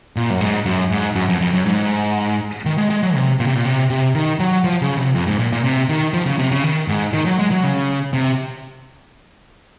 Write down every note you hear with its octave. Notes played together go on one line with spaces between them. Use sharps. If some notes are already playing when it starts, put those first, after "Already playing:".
A#2
F#2
G#2
F#2
G#2
F#2
F2
F2
F#2
G#2
D#3
G#3
G#3
F#3
C3
A#2
C3
A#2
C3
C3
D#3
F#3
F3
C#3
C3
F2
G#2
A#2
A#2
C3
D#3
F3
C#3
C3
C#3
D#3
G#2
D#3
F#3
G#3
F#3
C#3
C3